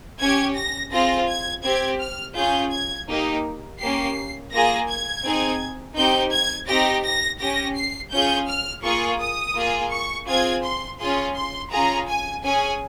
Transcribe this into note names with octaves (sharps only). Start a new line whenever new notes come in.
C#4 G4 G#6
A#6
C4 F4 G#4 A#6
G#6
C4 G4 G#6
F6
C#4 F4 G#4 G6
G#6
A#3 D#4 G4
A#3 C#4 G4 C7
A#3 F4 G#4 A#6
G#6
C4 D#4 G#4
C4 D#4 G4 G6
G#6
C4 D#4 G4 A#6
A#6
C#4 G4 A#6
C7
C#4 F4 G#4 G6
F6
A#3 F4 G#4 C#6
D#6
A#3 F4 G#4
C#6
C4 F4 G#4 G#6
C6
C#4 F4 G#4 C6
C6
C#4 F4 G#4 A#5
G#5
C#4 G#4 G#5